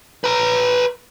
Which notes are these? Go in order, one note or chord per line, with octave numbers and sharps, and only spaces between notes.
B4 A#5